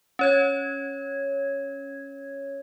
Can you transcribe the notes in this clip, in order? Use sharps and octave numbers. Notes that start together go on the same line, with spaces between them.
C#4 C#5 G#6